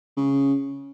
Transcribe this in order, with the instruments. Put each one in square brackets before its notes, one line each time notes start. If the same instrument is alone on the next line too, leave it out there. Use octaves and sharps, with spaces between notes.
[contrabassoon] C#3